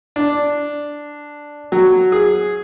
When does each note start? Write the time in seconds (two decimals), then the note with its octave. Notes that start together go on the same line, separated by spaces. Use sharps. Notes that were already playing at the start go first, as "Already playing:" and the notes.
0.16 D4
1.72 F#3
2.12 G#4